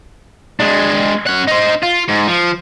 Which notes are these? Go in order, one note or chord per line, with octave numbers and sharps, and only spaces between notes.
G#3 D4
C#4 F#5
D#4 C5
F4
G#2
F3